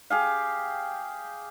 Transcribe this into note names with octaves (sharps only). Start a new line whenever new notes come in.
G4 G#4 F5